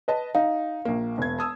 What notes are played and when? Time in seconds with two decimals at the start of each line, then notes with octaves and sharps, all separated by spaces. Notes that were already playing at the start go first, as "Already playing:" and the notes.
0.08 B4 D#5 A5
0.35 D#4 F5
0.85 A#1 A#3
1.18 E1 G#6
1.39 A5 D#6 E6